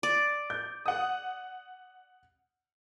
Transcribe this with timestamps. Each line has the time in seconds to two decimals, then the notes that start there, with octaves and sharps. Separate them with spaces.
0.03 D5
0.50 G6
0.86 F#5 D#6